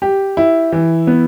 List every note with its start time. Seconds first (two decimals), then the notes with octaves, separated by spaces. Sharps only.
0.02 G4
0.37 E4
0.72 E3
1.07 B3